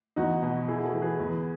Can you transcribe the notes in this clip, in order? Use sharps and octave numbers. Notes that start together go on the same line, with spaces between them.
E2 D#4 F#4
B2
E3 E4 G#4
G#4
F#4 A4
E3
G#4 B4
E2